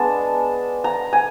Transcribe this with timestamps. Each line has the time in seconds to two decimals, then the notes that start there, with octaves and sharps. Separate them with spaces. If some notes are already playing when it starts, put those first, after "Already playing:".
Already playing: G#3 B3 D4 A5
0.84 A#5
1.13 G#5